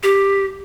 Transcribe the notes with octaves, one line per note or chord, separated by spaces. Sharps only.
G4